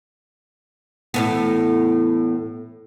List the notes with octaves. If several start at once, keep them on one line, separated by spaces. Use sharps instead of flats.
E2 A2 B3